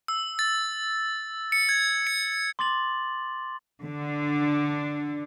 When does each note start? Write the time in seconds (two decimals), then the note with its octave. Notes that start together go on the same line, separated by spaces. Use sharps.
0.08 E6
0.39 A6
1.52 C#7
1.69 G#6
2.07 C#7
2.59 C6 D6 A6 F#7
3.83 D3